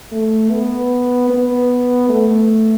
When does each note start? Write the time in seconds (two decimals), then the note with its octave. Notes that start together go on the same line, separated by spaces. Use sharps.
0.12 A3
0.51 B3
1.30 B3
2.09 A3